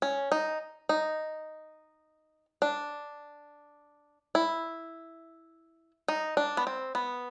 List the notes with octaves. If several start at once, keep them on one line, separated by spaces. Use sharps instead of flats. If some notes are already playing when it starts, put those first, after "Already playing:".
C#4
D#4
D#4
D4
E4
D#4
D4
B3
C4
B3